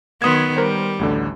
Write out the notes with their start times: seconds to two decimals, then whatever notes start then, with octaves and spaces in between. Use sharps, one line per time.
0.22 D#3 F#3 B3 C6 D#6 G#6
0.57 G3 A#4 C5
0.99 A1 D2 D3